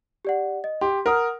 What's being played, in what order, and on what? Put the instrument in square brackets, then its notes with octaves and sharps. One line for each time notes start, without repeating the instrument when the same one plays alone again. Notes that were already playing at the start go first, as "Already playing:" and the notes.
[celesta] G4 D5 F#5
D#5
[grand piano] G4 [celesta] C6
[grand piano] A#4 [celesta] F#5 D#6 F6